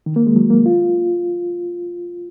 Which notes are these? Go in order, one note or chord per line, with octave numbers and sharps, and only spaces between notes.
D#3
A#3
G#3
F#3
A#3
F4